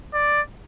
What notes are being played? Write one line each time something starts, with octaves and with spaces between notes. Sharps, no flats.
D5